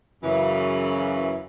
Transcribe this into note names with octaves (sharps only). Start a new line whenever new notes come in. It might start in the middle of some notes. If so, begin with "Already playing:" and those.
F#2 C#3 E3